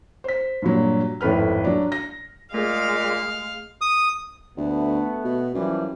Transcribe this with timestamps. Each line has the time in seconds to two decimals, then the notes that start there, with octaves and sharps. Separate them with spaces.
0.24 C5 B6
0.62 G2 A#2 F#3
1.21 G#1 F2 A2 B4 F6
1.64 F#3 D4
1.92 A#6
2.54 A#2 G#3 A3 G#4 F5
3.81 D#6
4.57 D2 A3 B3
5.25 B2
5.54 F#2 E3 F3 G3